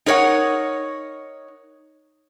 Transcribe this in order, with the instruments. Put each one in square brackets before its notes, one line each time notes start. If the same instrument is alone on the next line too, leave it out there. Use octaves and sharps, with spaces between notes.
[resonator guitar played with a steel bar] D#4 A#4 C#5 D5 F#5